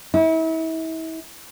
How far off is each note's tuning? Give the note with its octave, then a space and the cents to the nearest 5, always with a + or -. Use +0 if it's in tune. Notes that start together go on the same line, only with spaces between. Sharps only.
E4 -35